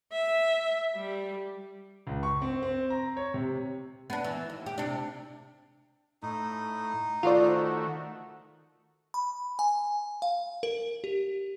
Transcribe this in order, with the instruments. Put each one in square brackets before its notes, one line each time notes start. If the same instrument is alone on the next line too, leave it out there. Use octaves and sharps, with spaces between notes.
[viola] E5
G3
[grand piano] C#2
C#6
C4
C4
A#5
C#5
C3
[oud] B3 D4
E3
D#2
G4
C3 D4
[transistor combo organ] A2 [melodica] D#4
[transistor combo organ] D#3 A3 F#4 [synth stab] F4 C5 D5
[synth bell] B5
G#5
F5
A#4
G4